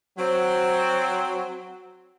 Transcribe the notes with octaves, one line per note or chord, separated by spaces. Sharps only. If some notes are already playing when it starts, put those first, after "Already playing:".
F#3 C4